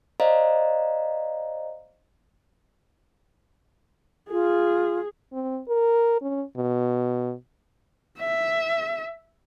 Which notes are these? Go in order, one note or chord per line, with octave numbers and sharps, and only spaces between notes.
C5 D5 D#5 F5 A#5
F4 G#4
C4
A#4
C#4
B2
E5